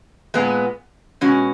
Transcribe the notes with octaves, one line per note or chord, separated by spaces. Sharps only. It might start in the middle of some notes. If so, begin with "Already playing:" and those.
A#2 G#3 B3
B2 G#3 C#4 F#4